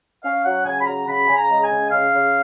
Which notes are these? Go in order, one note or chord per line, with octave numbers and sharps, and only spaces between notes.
C#4 F5
F#3 F#5
C#3 G#5
B5
F#3 A#5
C#3 B5
C#3 G#5
A#5
G#3
G#5
C#3
C#3 F5
C#3